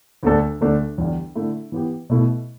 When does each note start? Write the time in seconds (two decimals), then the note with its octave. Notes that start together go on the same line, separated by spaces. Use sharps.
0.23 D2 D3 A3 D4 A4
0.61 D2 D3 A3 D4
0.98 E2 D3 G3
1.35 D3 A3 E4
1.72 E3 B3 G4
2.10 B2 A3 E4